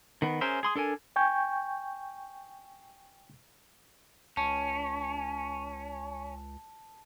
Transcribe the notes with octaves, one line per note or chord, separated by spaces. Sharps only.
D#3 B3
C#4 G#4 A#4 C5 E5
G#4 C6 D#6
D4 A4 A#4 G#5
G5 G#5 C#6 G6
C#2 C#4 A5